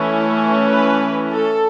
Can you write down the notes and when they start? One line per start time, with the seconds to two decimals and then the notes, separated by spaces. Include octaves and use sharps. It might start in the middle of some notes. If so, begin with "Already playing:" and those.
Already playing: E3 A3 C#4 E4
0.69 B4
1.29 A4